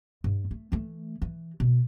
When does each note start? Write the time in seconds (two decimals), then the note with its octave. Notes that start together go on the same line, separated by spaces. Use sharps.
0.24 G2
0.51 A3
0.72 E3 A3
1.22 E3
1.60 B2